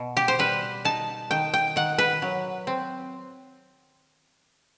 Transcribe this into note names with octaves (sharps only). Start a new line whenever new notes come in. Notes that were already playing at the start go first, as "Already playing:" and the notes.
Already playing: B2
G4
C5
G3 B4
D#4 A5
D#3 G5
G5
D#3 F#5
B4
F#3
C4